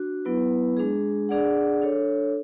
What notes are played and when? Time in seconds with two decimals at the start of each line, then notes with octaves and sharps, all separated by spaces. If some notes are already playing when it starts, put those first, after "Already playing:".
Already playing: D4 F#4
0.25 F#3 B3 E4 B4
0.77 G#3 D4 G#4
1.29 D4 G#4 D5 F#5
1.82 D4 A4 C#5